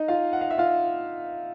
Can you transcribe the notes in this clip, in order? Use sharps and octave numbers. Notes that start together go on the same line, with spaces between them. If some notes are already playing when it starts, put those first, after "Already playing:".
Already playing: D#4 D#5
F4 F5
F#5
F5
E5
F4 F5